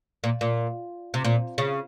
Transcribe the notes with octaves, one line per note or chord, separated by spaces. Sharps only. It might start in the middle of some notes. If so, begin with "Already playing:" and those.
A#2
A#2
C3
A#2
C#3